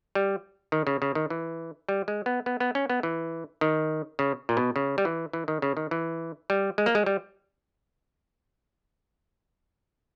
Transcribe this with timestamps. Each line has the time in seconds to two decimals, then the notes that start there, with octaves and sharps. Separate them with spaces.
0.15 G3
0.72 D#3
0.87 C#3
1.02 C#3
1.15 D#3
1.30 E3
1.89 G3
2.08 G#3
2.26 B3
2.46 B3
2.60 B3
2.75 C#4
2.90 B3
3.03 E3
3.61 D#3
4.19 C#3
4.49 A#2
4.57 B2
4.76 C#3
4.98 G3
5.05 E3
5.33 E3
5.48 D#3
5.62 C#3
5.77 D#3
5.91 E3
6.50 G3
6.78 G#3
6.86 A#3
6.95 G#3
7.06 G3